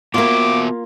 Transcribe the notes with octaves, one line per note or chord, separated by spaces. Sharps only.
A#3 B3 F4 F#4 E5 D6